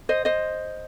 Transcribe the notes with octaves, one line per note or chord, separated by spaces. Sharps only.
C5 D#5
C5 D#5